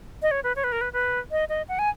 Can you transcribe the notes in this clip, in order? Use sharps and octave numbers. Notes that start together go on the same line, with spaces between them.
D#5
C#5
B4
C#5
B4
A#4
B4
B4
D#5
D#5
F#5
G#5